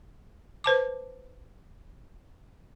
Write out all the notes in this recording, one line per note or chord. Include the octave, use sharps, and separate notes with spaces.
B4 C5 A5 D6